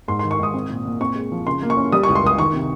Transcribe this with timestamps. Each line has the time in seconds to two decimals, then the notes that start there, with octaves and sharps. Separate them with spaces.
0.08 G#2 C6
0.19 D#3 C6
0.31 C#6
0.39 G#2 D#6
0.54 C4
0.70 A#2
0.85 A#2
1.01 C4 C#6
1.15 G#3
1.32 F3
1.47 C#3 C6
1.62 A#3
1.70 C#6
1.77 C#4
1.92 G3 D#6
2.03 C#2 C#6
2.15 C6
2.23 C#2 D#6
2.38 D#3 C#6
2.53 C3